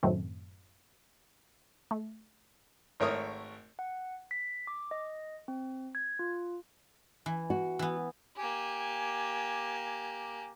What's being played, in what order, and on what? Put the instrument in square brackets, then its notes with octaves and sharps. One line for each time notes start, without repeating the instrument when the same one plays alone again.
[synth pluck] F#2 A2 D#3 F#3 A3 C4
A3
[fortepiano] G#1 A3 A#4 C#5 C#6 D#6
[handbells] F#5
B6
D6
D#5
C4
G#6
F4
[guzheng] E3
[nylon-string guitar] F#4
[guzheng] E3 B3
[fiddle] A#3 G4 [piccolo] G#5